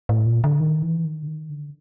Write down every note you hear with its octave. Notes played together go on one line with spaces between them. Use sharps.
A2
A#2
D3
D#3
E3
D#3
D3
D#3
D3